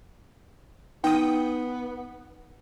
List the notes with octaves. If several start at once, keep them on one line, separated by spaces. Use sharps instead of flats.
B3 D#4 G5 D#6